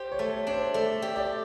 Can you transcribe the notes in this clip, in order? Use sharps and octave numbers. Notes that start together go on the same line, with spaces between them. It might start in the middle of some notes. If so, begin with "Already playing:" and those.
Already playing: G4 C5
C#5
A3
C#5
D4 C#5
C5
A3 D5
G4
D5